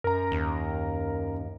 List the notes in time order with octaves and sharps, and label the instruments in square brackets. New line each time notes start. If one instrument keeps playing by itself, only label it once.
[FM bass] F#2 [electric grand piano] A#4 A#5
[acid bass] D#2